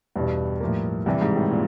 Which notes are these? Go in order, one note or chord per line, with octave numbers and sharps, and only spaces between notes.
E2 G2 B2 G3
A2 F3 A#3
G2 C3 E3 G3
G#2
A2
A#2